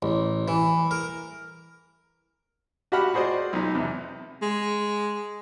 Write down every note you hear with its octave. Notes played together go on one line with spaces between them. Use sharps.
A1
E3
A#4
F#4 G4 E5 F#5 B5 F6
F#4 G#4 C5 D5 D#5
B1 D#4
E2 C3
G#3